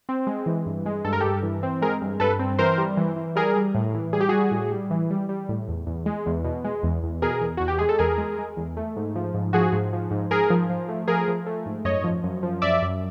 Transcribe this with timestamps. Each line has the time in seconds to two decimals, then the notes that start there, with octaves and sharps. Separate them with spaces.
0.09 C4
0.27 G#3
0.46 E3
0.66 G2
0.86 G#3
1.05 G2 A4
1.13 A#4
1.20 G2 G4 A4
1.43 E3
1.63 C4
1.82 G#3 G#4 A#4
2.02 G2
2.20 G2 A4 B4
2.39 C4
2.59 E3 A#4 C5
2.78 G3
2.97 E3
3.16 E3
3.35 G3 G#4 A#4
3.56 G3
3.74 A2
3.94 E3
4.13 G3 G#4
4.20 G4
4.29 G3 F#4 G#4
4.51 A2
4.71 G3
4.91 E3
5.10 G3
5.29 G3
5.49 A2
5.68 E2
5.86 E2
6.06 G#3
6.26 E2
6.44 B2
6.64 G#3
6.83 E2
7.03 E2
7.22 B2 G#4 A#4
7.41 E2
7.57 E2 F#4
7.68 G4
7.79 G#3 G#4
7.89 A4
7.99 E2 G#4 A#4
8.18 G#3
8.38 G#3
8.57 E2
8.77 A3
8.96 G#2
9.16 F3
9.34 G#2
9.53 F3 F#4 G#4
9.72 G#2
9.93 F3
10.11 G#2
10.30 G#2 G#4 A#4
10.50 F3
10.70 F3
10.89 A3
11.08 F3 G#4 A#4
11.28 F3
11.46 A3
11.66 G#2
11.85 F#2 C#5 D#5
12.04 F3
12.23 F#2
12.43 F3
12.62 F#2 D5 E5
12.82 F#2